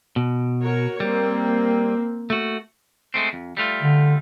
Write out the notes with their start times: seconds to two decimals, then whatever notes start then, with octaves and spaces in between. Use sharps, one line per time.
0.16 B2
0.61 F#4 A#4 C#5
1.00 G3 A#3 C4
2.30 A3 F#4
3.14 G#3 A3 C4
3.33 F2
3.57 G3 A3 F4
3.83 D3